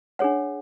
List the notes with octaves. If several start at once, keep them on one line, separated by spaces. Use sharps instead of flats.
D4 G#4 C#5 F#5